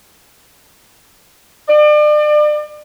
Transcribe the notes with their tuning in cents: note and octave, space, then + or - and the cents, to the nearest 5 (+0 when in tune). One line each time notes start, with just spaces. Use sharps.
D5 +35